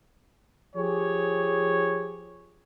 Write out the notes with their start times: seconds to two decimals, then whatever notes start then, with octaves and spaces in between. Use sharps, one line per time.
0.75 F3 G4 G#4 C#5